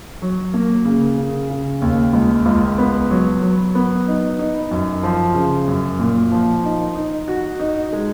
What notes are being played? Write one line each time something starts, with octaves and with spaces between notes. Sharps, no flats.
F#3
A#3
C#3
C#3
C#3
D#2
C#2
C#2
B3
F#3
F#3
B3
D#4
D#4
F#2
F3
C#3
F#2
A#2
F3
D#4
D#4
F#4
D#4
G#3